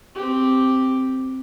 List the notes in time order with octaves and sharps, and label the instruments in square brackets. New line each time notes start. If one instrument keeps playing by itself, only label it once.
[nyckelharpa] C4 G4